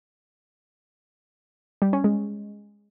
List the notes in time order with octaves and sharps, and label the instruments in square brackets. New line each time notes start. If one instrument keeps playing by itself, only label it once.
[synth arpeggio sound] G3
C#4
G#3